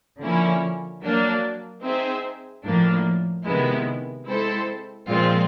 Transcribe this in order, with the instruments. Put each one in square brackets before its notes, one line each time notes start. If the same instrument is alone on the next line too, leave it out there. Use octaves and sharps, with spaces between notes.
[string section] D3 F3 A#3 C#4 E4
F#3 A#3 D4
C4 D#4 G#4 C5 E5
A2 F3 A#3 D4
C3 D#3 G#3 B3 E4
G#3 C4 E4 A4 C5
A#2 F3 G#3 C4 F4